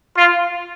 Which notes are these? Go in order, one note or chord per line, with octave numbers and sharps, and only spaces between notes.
F4